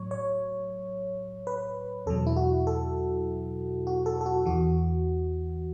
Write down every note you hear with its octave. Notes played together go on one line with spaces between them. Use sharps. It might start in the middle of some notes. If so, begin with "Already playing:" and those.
Already playing: A2 F#3 C#5
C#5
B4
E2 B2 F#3 A4
E4
F#4
A4
F#4
A4
A4
F#4
E2 E3 F#4